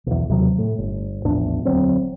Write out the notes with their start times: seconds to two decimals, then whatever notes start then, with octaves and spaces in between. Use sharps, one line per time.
0.06 B1 E2
0.29 D#2 C3 F#3
0.58 A2
0.78 G1
1.25 A#1 E2 A2 D4
1.65 E1 D2 F#3 C4